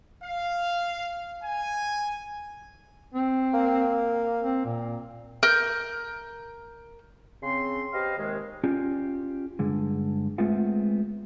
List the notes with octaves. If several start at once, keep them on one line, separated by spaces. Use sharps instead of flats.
F5
G#5
C4
A#3
C4
A#2
A#4 G6
C#3 C4 C6
G4 B4 C5 D#5 F5
D#2 C3 D#3 G#3
C#4 F4 G4 D5
G2 D3 G#3
G#3 A3 B3 C4 F4 F#5